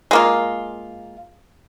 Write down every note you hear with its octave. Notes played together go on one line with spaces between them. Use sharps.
G#3 A#3 F4